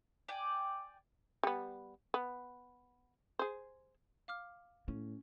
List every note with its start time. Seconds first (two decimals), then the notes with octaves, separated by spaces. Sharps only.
0.28 D5 G5 G#5
1.43 G3 B3
2.14 B3
3.39 G#4 C5
4.28 F5 D6 F6
4.88 A2 C#4